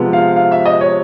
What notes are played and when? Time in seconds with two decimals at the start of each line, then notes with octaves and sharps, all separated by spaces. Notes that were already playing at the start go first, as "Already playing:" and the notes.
Already playing: C3 F3 G#3 B3
0.13 F5
0.36 F5
0.52 E5
0.65 D#5
0.81 C#5